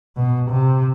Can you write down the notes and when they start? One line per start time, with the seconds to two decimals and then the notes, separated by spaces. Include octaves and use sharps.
0.16 B2
0.50 C3